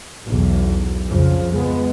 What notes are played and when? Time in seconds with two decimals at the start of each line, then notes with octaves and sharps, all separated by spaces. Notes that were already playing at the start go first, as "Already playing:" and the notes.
0.24 B1 E2
1.08 F2 C#3 F3
1.54 G#3 B3